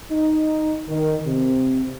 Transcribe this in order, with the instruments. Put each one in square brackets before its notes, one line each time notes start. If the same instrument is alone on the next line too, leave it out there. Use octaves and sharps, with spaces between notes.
[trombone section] D#4
D#3
C3